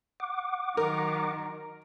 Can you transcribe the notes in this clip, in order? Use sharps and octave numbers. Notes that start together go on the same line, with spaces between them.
F#5 D6
D#3 F#3 A#4